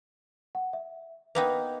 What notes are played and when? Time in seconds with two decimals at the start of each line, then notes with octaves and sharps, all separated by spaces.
0.55 F#5
0.73 E5
1.35 A#3 B3 D#4 B4 G5